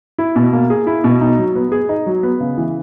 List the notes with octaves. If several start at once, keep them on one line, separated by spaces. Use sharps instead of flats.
E4
B2
A#3
G#4
E4
B2
D#4
F#3
B3
G#4
D#4
F#3
B3
C#3
E3